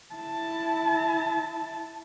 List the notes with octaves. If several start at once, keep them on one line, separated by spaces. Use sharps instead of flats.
E4 A5